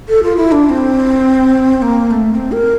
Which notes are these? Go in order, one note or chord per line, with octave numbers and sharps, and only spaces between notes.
A4
F4
E4
D4
D4
C4
C4
A#3
A#3
A3
C4
A#4